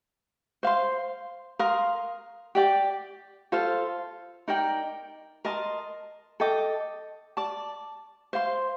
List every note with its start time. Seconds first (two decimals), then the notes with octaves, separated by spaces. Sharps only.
0.63 C5 F5 C6
1.59 A#4 F5 C6 D#6
2.55 G4 D5 G5 D6
3.52 F4 A4 C5 F5
4.48 D#4 A#4 D5 G5
5.45 A#4 D#5 A5 C6
6.40 A4 D#5 G5 D6
7.37 D5 A5 D6
8.33 C5 F5 C6